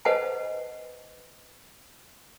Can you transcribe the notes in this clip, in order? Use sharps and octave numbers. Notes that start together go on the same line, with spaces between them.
B4 C5 D#5 F#5 G#5 A5